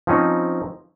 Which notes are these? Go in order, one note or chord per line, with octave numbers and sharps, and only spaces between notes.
F3 C4 C#4 D#4